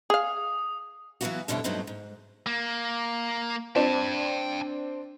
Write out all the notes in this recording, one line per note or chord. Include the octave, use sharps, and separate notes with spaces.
G#4 F5 D#6
E3 F#3 G3 B3 F4 F#4
F2 B2 D3 G3 E4 C#5
G2 B2 F#3 A3 C4 D#4
G#2
A#3
C4 D4 G5 A5